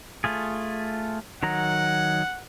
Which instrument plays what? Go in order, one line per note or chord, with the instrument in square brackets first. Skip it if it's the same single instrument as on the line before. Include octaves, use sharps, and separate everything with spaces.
[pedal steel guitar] A3 F4 G#4
[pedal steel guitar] D#3 F#3 A#5 [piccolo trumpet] F#5